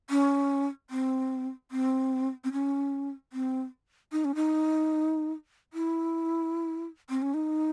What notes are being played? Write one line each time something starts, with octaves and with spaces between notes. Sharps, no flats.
C#4
C4
C4
C4
C#4
C4
D#4
C#4
D#4
E4
C4
C#4
D#4